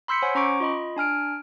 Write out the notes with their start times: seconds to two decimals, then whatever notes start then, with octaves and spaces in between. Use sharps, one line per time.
0.08 B5 C6 E6 G6 B6 C#7
0.22 C5 C#5 F#5 G#5
0.35 C#4 A#5 C#6 D6 D7
0.60 F4 D#5 B5
0.96 D4 G#5 F6 D7